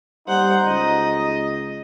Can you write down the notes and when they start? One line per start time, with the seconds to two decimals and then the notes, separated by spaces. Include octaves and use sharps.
0.28 G3 D#4 C5 F#5
0.67 C#2 D#5